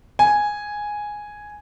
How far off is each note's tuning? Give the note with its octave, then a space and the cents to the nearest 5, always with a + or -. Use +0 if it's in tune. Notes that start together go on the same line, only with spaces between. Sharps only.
G#5 +0